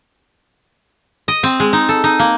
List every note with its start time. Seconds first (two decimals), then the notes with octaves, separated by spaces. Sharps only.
1.28 D#5
1.43 C4
1.60 G#3
1.73 D#4
1.89 A4
2.04 D#4
2.19 A#3